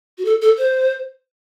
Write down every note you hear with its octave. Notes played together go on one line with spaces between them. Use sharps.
F#4
A4
A4
C5